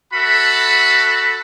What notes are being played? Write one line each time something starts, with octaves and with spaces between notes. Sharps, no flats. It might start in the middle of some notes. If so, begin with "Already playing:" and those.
F#4 A4 E5 B5